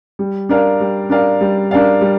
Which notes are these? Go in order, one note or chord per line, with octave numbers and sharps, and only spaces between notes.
G3
D4 A#4 D5 F5
G3
D4 A#4 D5 F5
G3
D4 A#4 D5 F5
G3